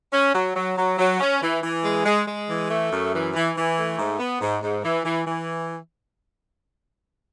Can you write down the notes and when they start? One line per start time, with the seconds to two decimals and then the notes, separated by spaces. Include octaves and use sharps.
0.13 C#4
0.35 F#3
0.56 F#3
0.78 F#3
0.98 F#3
1.20 C#4
1.42 E3
1.63 E3
1.84 G#3
2.05 G#3
2.27 G#3
2.48 E3
2.70 A3
2.92 F#2
3.13 E3
3.34 E3
3.56 E3
3.78 A3
3.99 G#2
4.19 B3
4.41 G#2
4.62 G#2
4.84 E3
5.05 E3
5.26 E3